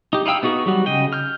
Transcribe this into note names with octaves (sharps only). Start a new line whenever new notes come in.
D#4 G4
D#4 E4 F5 G5 E6
B3 D#4 F#4 G#4
F#3 G3 F#4
C#3 D#5 G5
F6 G6